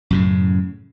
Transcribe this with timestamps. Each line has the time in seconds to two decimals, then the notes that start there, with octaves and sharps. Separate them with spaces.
0.11 F#2 A2 C#3